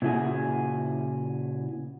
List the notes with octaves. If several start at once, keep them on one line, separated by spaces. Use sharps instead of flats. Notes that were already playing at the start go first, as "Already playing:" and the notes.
A#2 C#3 E4 F#4 G#4